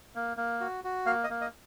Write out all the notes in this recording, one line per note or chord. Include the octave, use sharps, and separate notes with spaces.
A#3
A#3
F#4
F#4
A#3 F5
D#5
A#3
D#5